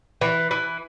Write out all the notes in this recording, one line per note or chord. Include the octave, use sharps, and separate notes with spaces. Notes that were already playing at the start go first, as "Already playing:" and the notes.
E3
E3